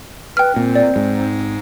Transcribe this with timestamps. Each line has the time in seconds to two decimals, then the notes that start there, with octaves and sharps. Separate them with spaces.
0.37 B4 G5 F6
0.56 A#2 C4
0.75 D5
0.96 G#2